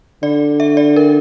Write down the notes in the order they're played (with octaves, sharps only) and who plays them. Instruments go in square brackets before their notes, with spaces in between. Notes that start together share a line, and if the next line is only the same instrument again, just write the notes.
[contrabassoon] D3 [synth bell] D5
[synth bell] E5
D5
A#4